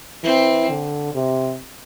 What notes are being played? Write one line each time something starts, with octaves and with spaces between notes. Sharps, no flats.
E3 C4
D3
C3